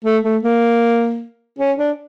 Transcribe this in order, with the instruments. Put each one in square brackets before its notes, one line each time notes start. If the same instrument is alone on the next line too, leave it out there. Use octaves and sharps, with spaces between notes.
[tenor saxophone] A3
A3
A#3
C#4
D4